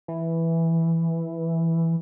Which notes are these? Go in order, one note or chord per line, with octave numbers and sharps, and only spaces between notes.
E3